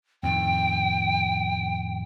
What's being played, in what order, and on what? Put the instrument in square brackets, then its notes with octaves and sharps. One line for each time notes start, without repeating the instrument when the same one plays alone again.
[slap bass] F2 A2 D#3 [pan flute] G5